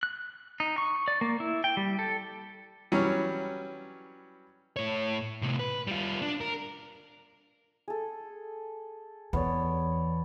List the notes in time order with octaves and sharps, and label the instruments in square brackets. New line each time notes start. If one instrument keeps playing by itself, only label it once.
[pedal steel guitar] F#6
D#4
C#6
D5
A#3
E4
G5
G3
A4
[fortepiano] E3 F#3 G3 C#4
[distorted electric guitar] A2 C#5
A2 C3
B4
G3 F4
D4
A#4
[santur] G#4 A4
[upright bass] E2 [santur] B3 C#5 D5